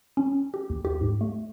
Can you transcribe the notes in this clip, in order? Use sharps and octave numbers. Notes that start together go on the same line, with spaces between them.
C#4
G4
D#2
G4
G#2
A3